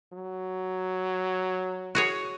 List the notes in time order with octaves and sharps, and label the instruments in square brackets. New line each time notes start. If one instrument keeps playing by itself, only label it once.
[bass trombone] F#3
[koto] F#4 G#4 C#5